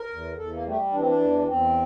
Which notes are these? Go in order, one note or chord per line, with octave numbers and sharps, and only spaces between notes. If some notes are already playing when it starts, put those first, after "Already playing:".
Already playing: A#4
E2
E2 A4
A#3
G3 A3
E3 D4
C4
D4
E2
E2 C4